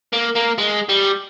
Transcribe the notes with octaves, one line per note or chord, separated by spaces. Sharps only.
A#3
A#3
G#3
G3